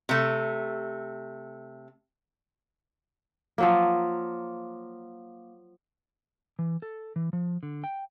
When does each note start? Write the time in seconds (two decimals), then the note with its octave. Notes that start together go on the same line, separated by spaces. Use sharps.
0.09 C3 A3
3.58 F3 F#3 A#3
6.59 E3
6.82 A4
7.16 E3
7.33 F3
7.63 D3
7.84 G5